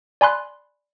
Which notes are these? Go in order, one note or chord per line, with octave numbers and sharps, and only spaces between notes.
D5 G#5 B5 C6 F#6